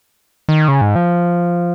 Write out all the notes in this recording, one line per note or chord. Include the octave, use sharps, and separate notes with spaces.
D#3
C#3
G#2
F3